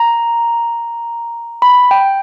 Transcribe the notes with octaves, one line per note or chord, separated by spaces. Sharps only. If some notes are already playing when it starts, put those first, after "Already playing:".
Already playing: A#5
B5
G5